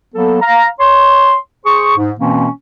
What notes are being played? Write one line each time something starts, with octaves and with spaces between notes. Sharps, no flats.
F#3 A#3 B3 A4
F5 A#5
C#5 C6
G#4 C5 C#6
G#2
B2 E3 A#3 C4 C#4